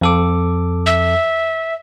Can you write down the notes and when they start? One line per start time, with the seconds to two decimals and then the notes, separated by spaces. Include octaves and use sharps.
0.01 F2 A4 D6
0.86 E5